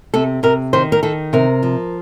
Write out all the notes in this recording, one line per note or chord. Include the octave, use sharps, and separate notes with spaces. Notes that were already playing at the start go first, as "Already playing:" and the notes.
C3 A4
C3 A#4
D#3 C5
A#4
D#3 A4
C3 A#4
F3